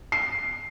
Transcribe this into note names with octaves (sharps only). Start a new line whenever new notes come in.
C7